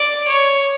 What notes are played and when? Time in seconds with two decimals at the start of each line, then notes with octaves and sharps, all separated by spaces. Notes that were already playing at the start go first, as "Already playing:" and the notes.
Already playing: D5
0.28 C#5